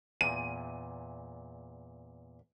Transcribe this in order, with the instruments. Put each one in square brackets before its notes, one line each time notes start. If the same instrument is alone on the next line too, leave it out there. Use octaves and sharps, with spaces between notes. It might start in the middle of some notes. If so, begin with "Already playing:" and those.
[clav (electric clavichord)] E2 A#2 [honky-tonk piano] D#7